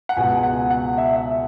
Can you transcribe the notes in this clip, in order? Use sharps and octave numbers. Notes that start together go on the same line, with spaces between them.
F#5
C#2 B2 G#3 G#5
F#5
F#5
E5
E5